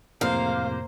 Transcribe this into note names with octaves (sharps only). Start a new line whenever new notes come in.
F2 A2 C3 A#3 C5 F5